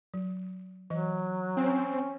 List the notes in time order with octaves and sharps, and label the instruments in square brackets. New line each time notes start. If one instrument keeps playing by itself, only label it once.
[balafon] F#3
[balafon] E3 D#5 [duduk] F#3
[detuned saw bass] C4 [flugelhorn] C#4